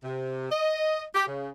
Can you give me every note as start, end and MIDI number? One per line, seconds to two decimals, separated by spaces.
0.03 0.51 48
0.51 1.02 75
1.14 1.23 67
1.26 1.49 49